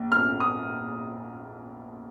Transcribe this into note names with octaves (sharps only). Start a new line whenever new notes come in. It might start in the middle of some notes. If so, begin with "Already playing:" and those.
Already playing: A#1
F6
D#6